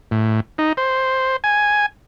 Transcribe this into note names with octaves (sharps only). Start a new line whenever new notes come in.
A2
D#4
C5
G#5